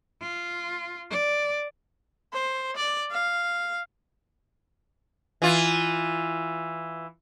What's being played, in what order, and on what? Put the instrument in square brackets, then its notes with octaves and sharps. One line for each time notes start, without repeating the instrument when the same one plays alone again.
[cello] F4
D5
[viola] C5
D5
F5
[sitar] E3 F4